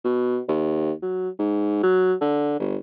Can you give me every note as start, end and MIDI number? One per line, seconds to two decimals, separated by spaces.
0.05 0.40 47
0.48 0.92 39
1.02 1.29 54
1.39 1.80 44
1.83 2.14 54
2.21 2.57 50
2.60 2.77 31